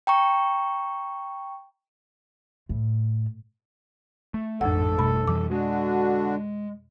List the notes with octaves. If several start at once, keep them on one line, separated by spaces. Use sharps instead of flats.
G5 A#5 C#6
A2
A3
A1 F2 G#2 A4 F#5
G#1 B2 G3 A3 B5
F2 E3 G3 D6
D3 G#3 D4 F#4